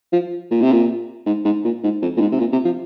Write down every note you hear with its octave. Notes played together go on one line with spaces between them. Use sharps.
F3
A#2
C3
A#2
G#2
G#2
A#2
G#2
F2
A#2
G#2
C3
A#2
C3
F3